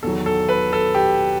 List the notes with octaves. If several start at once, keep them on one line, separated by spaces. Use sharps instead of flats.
E2 D#3 F#3 A4
A4
B4
A4
G4